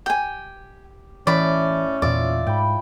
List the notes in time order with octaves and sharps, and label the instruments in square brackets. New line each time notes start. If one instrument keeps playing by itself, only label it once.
[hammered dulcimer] G4 [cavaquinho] G5 G#5
[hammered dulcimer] A2 [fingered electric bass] E3 [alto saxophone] C#4 [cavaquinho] D5 B5
[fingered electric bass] E2 A#2 [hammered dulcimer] F4 E5 [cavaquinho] D5
[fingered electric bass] G#2 [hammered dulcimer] G5 B5